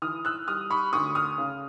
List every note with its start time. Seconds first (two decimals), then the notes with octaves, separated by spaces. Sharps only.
0.02 E3 D#6 F6
0.25 E6 F#6
0.48 G3 D#6 F6
0.70 B5 C#6
0.93 D2 C#6 D#6
1.15 D#6 F6
1.38 C#3